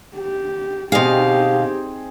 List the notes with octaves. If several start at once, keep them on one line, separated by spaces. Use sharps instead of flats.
G4
B2 C4 D#4 G4 G#4 F5